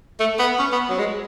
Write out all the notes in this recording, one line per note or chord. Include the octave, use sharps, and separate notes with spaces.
A3
B3
C#4
B3
F#3
G#3